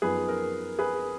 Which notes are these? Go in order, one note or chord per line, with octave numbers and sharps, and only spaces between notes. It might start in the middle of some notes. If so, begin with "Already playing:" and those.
F#2 F3 B3 D#4 G#4 B4
A#4
G#4 B4